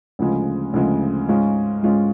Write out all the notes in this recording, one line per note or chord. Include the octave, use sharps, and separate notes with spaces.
D2 C#3 F3 G#3
D2 C#3 F3 G#3
G#2 G#3 C#4 F4
G#2 G#3 C#4 F4